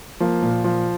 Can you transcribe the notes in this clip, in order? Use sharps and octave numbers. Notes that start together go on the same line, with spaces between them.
F3 A#3
A#2
F3